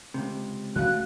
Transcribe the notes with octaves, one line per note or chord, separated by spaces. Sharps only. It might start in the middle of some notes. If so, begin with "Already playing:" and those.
C#2 C3
C#3 A3 C4 F#4 F5 F#6